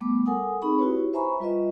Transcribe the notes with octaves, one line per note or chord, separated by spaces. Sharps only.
G3 A3 B3 D6
A4 A#4 F#5 G#5 D#6
C4 D#4 G#4 B5 C#6
E4 F#4 G4 B4 C#5
C5 E5 G#5 A#5 B5 C#6
G3 F4 B4 D#5 E5